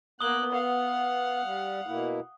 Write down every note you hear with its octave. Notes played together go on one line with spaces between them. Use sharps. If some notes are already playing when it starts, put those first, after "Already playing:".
A#3 B3 D#6 F#6 G7
F5 F#5
G3
B2 A#3 E4